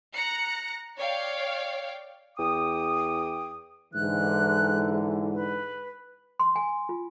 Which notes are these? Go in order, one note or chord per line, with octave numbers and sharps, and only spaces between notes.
A#5 F#6 A#6 C#7
C#5 D5 F5 G5
E2 G5 D6 D#6
G#2 D3 E3 F#6
B4
C6
G#5
F4